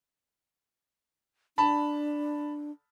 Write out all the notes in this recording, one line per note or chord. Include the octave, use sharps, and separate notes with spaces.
D4 A5 B5